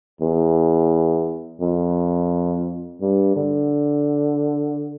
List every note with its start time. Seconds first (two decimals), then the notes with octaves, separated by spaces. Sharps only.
0.21 E2
1.61 F2
3.01 G2
3.36 D3